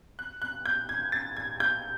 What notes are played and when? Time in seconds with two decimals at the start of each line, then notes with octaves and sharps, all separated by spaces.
0.19 F#6
0.42 F#6
0.66 G6
0.89 G#6
1.12 A6
1.36 G#6
1.60 G6